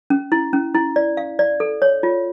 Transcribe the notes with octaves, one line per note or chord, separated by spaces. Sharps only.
C#4
E4
C#4
E4
D5
F5
D5
A4
C#5
F4